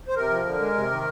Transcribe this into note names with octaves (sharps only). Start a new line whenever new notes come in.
C5
C3 A#4
F3
D3
G#3
C3
D#3